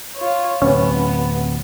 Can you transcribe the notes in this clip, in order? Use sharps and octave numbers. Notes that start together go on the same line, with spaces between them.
F4 C#5
D1 C3 B3 C#4